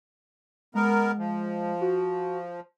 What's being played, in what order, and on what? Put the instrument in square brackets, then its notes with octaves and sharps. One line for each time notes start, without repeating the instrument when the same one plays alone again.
[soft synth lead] G#3 [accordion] B3 A#4
[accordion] F3
[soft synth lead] F#4